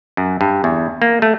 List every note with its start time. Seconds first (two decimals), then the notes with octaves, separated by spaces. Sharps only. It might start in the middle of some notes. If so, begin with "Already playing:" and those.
0.17 F#2
0.41 G2
0.64 E2
1.02 A#3
1.22 A3